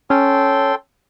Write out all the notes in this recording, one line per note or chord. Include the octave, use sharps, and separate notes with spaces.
C#4 A4 G5 C6